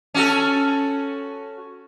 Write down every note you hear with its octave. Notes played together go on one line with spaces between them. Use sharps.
C#4 F#4 A4